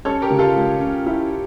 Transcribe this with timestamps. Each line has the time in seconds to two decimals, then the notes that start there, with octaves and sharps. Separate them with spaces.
0.05 C#4 A4 C#5
0.22 G4 A#4
0.30 C#3
0.39 F4 A4
0.56 C#2
0.80 C#4
1.06 E4